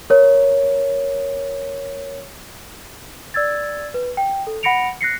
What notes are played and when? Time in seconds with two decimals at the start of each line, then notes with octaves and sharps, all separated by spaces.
0.10 A#4 C#5
3.34 D5 E6 G#6 A6
3.94 B4
4.17 G5
4.47 A4
4.63 F#5 B5 A#6 C#7 D7 F7
5.01 F#6 A#6 C7 C#7